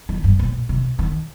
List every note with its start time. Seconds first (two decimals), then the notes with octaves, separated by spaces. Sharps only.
0.09 D#3
0.24 G2
0.39 A#2
0.69 C3
0.99 D#3